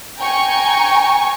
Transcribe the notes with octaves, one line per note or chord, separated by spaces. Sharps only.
G5 G#5 A#5 C#6